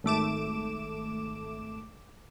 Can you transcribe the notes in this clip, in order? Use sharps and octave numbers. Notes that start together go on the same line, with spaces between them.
G#1 A3 D6 E7